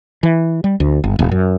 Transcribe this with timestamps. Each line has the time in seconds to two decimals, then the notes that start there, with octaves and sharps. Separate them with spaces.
0.23 E3
0.64 G3
0.80 D2
1.04 G1
1.19 D#1
1.31 F#2